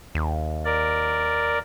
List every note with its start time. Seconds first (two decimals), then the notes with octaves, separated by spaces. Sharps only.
0.15 D#2
0.65 A#4 D5